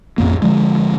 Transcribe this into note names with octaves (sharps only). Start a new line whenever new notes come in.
A1 F2 A#3
D3 F3 G#3